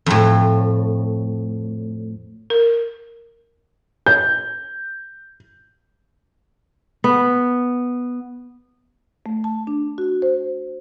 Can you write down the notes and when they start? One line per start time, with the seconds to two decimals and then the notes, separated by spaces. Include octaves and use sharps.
0.06 F2 A2
2.50 A#4
4.06 G6
7.04 B3
9.26 A3
9.44 A5
9.67 D4
9.98 F#4
10.22 C5